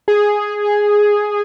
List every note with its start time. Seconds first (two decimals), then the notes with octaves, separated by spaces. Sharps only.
0.08 G#4